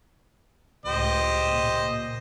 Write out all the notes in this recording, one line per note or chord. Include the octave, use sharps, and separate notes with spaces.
C#2 A2 G4 C5 D#5
A#2